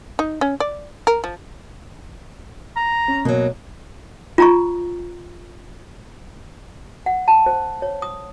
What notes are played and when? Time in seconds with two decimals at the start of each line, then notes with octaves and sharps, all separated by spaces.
0.19 D#4
0.41 C#4
0.60 D5
1.07 A#4
1.24 F3
2.76 A#5
3.08 C#4
3.25 B2 F#3 A#3
4.38 F4 A#5 C#6
7.06 F#5
7.28 A5
7.46 C5
7.82 C#5
8.02 D#6